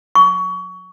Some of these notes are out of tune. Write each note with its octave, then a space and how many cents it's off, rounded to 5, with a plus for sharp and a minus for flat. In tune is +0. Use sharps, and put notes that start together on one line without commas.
C#6 +25